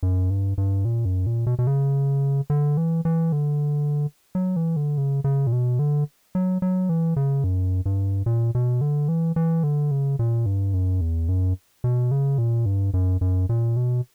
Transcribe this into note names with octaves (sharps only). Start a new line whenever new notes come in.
F#2
G2
G2
A#2
F#2
A#2
B2
B2
C#3
D3
E3
E3
D3
F#3
E3
D3
C#3
C#3
A#2
B2
D3
F#3
F#3
E3
C#3
F#2
G2
A#2
B2
D3
E3
E3
D3
C#3
A#2
G2
F#2
E2
F#2
B2
C#3
A#2
G2
F#2
F#2
A#2
B2